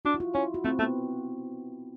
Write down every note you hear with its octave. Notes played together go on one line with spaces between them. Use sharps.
D4 F#4
E4
F4
C#4 E4
F#4
A3 C4
A3 B3